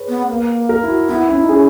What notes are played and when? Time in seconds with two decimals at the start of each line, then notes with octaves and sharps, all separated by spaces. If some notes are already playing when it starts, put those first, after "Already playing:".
Already playing: G#4 B4 C#5
0.08 B3
0.29 A#3
0.69 A#4
0.83 E4
0.89 F#4
1.09 B3 E4
1.29 C#4 E4
1.41 D#4
1.49 C#4 G#4